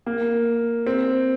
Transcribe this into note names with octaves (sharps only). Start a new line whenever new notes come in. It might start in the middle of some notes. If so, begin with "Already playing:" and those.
A#3
C4